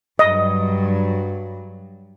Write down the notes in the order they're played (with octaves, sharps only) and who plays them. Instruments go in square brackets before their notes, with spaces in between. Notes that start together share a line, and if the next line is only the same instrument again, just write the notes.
[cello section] G2 F#3 [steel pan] D#5